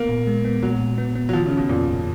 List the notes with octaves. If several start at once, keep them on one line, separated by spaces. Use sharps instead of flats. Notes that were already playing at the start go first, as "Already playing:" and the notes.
Already playing: A#3 B3
A#2
G#3
B3
A#2 F#3
A#2
B3
B3
F#3
D#3 F3
C#3
C#4
B2
F2 A#2
F2